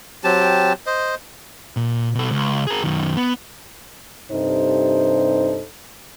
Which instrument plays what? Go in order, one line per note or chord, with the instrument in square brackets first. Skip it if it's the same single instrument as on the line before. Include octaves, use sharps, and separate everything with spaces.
[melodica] F#3 C4 G4 A5
C5 D#5
[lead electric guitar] A#2
B2 A4
C#2
G#4 A#4
F#2 D#3
B3
[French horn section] G2 C3 D#4 A4 C5